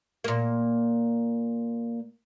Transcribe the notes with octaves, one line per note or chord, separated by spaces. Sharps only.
A#2 A#3